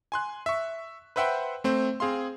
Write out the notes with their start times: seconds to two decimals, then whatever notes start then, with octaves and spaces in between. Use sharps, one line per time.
0.12 G#5 C6 F#6
0.46 E5 C#6
1.16 B4 C5 E5 F#5 G5 C6
1.64 A3 C4 C5
2.00 C4 G#4 F5 C6